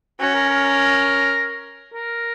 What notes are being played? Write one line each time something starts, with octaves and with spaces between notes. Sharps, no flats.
C#4 F#4
A#4
A#4
A#4
A#4